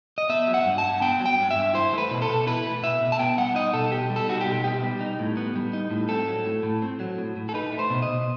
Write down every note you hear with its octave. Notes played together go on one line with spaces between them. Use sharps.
D#5
B3 E5
F#3
F#5
G2
A5
G2
B3 G5
F#3
G5
G2
E5
G2
E4 C5
A3 B4
B2
A4
B2
E4 B4
A3
B2 E5
B2
A5
B3 G5
G3 F#5
D#4 D#5
B2 A4
B3 G4
G3
A4
D#4 F#4
G4
B2
B3 G4
G3
D#4
A2
B3
G3
D#4
A2
C4 A4
F#3
A2
A2
C4
F#3
A2
A2
A4
D#4 B4
A3
C5
B2
D#5
B2